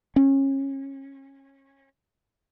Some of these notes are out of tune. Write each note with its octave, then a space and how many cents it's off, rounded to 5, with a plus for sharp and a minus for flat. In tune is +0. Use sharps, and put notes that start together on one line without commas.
C#4 -25